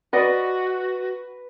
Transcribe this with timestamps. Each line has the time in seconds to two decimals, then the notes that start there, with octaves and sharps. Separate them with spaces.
0.13 F#4 B4 D5 D#5 F#5